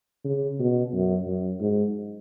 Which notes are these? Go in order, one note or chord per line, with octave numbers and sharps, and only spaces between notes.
C#3
B2
F#2
F#2
G#2